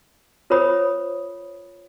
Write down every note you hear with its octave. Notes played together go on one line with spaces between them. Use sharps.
F4 A#4 C5 C#5 B5 D#6